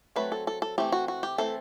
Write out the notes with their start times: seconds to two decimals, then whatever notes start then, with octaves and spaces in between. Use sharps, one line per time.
0.16 F#3 A3 C4 B4
0.32 A4
0.47 A4
0.62 A4
0.78 E3 A3 C4 G4
0.92 F#4
1.08 F#4
1.23 G4
1.38 E3 A3 C4 A4